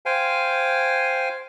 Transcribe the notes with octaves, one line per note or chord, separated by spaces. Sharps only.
C5 F5 G5 G#5